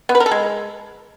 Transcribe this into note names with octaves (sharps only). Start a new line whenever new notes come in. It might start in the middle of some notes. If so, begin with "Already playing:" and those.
B3
B4
A#4
A4
G#3